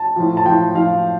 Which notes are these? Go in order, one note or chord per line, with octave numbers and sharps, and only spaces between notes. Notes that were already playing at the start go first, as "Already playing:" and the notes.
Already playing: A5
A2 F3
A5
A2 F3 G5
A2 F3 F5